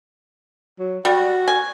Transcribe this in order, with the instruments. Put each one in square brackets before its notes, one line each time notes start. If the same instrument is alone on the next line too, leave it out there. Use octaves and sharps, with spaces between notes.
[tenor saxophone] F#3
[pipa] G3 [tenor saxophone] F#4
[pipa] G#5